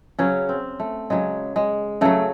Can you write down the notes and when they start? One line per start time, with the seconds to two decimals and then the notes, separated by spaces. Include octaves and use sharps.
0.18 C#3 F#3 C#4
0.49 C4
0.80 A3
1.10 C#3 F#3 G#3
1.56 G#3
2.01 C#3 F#3 A3